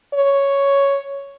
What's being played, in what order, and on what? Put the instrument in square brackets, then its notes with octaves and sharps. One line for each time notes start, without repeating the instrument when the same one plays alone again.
[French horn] C#5